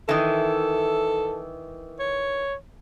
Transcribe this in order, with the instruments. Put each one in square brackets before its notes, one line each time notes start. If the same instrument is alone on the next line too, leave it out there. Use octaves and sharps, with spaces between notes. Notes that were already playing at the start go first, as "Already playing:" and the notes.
[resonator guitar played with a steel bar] D#3 E3 [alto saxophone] A4
[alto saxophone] C#5